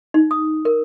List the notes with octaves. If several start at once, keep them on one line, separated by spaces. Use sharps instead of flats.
D#4
D#6
A#4